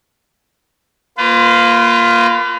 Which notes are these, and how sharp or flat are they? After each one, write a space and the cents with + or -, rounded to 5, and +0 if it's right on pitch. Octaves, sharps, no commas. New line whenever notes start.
A#3 +0 F4 +0 B4 +35